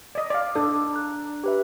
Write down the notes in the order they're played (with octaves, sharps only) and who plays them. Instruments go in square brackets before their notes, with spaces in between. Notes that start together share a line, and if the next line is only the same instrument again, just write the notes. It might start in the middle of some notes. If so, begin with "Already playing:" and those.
[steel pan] D5 D#5
D5 F5
[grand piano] D4 [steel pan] A4
[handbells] A#5 F#6
G4 B4 E5